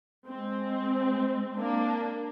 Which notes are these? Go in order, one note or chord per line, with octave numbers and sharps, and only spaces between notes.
G#3 C4
A#3 D4